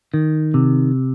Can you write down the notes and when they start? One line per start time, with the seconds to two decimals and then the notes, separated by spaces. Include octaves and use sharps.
0.14 D#3
0.54 C3